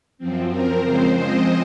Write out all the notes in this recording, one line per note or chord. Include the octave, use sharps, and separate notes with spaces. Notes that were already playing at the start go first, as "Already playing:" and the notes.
F#2 F3 C4
A#4
C#3 F3 G#3 C4 C5
D#5